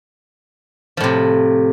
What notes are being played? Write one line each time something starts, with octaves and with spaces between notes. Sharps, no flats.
A2 C3 F3